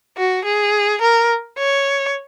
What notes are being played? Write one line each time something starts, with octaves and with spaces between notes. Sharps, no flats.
F#4
G#4
A#4
C#5